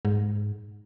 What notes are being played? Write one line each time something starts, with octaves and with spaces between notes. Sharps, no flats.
G#2